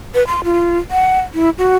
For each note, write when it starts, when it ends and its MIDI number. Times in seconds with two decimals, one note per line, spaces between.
0.15 0.27 71
0.27 0.44 84
0.44 0.78 65
0.91 1.20 78
1.34 1.50 64
1.58 1.77 66